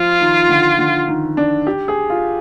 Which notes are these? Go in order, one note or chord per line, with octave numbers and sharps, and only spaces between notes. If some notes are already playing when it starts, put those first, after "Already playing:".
Already playing: F3 F4
D#3
D3
D3
D#3
D4
G4
G#4
F4